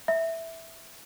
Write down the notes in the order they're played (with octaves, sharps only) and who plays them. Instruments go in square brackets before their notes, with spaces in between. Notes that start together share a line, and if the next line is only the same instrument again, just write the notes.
[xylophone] E5